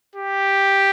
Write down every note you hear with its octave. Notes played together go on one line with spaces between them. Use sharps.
G4